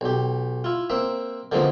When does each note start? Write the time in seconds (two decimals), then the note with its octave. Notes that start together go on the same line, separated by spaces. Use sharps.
0.01 B1 G4
0.64 E4 F4
0.90 A#3 C4 E5
1.52 D3 E3 F3 G#3 A#3 C4